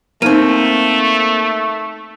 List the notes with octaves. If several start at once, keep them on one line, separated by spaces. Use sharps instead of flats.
A3 A#3 C4 D#4 D#7